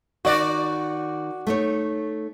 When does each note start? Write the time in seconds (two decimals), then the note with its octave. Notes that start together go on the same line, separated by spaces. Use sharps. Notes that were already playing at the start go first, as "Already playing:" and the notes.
0.25 D#3 F#4 D5
1.47 A3 D#4 C#5